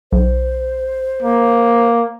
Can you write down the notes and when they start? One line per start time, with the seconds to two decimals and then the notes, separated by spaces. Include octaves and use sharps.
0.12 B1 C5
1.22 A#3